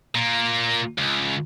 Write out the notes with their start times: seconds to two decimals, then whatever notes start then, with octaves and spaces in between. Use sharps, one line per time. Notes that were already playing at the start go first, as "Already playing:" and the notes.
0.15 A#2 A#3
0.98 C#2